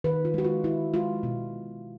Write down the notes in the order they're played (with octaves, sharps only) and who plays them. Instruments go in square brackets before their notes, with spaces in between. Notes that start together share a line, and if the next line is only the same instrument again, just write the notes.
[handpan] D#3 B4
F4
G#3 F#4
F4
D#3 E4
G#3 F4
B2